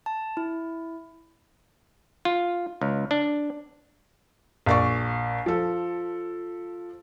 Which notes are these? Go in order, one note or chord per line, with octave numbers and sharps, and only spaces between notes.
A5
E4
F4
C#2
D4
A#1 D5 C#6
F3 A4